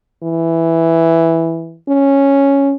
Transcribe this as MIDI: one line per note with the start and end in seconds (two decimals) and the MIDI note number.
0.23 1.77 52
1.89 2.75 61